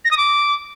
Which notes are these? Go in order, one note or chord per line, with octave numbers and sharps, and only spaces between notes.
A#6
D#6
D6